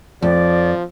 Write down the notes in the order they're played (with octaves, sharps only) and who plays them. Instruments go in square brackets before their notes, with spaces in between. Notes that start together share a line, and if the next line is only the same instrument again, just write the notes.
[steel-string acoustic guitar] F2 [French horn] F3 [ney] D5